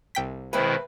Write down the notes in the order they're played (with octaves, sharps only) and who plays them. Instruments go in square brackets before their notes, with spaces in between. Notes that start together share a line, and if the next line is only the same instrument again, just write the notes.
[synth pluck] C2 G5 B6
[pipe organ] B2 D#3 E4 [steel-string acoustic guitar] G#3 A3 C4 [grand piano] B4